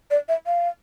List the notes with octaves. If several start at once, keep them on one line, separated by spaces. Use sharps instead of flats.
D5
E5
F5